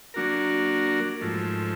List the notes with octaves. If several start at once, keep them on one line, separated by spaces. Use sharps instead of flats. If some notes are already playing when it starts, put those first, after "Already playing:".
F#3 A#3 D4 F#4 A#4
G#2 F3 A3